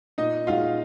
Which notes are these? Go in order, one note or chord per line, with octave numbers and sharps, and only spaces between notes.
A#2 D#4 D#5
G#3 D#4 F4 F#4 F5